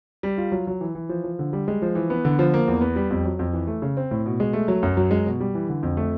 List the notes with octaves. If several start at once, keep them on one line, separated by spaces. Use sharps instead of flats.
G3
F4
F#3
F#3
E3
E3
F3
F3
D3
G3
G#3
F3
E3
B3
D3
F3
A#3
E2
B3
G3
F2
F#3
F2
E3
A3
C#3
C4
A2
B2
G#3
A3
F#3
F#2
F#3
G#3
B2
G3
E3
D3
F2
A3